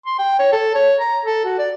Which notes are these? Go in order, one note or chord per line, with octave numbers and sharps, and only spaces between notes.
C6
G5
C#5
A4
C#5
A#5
A4
F#4
D5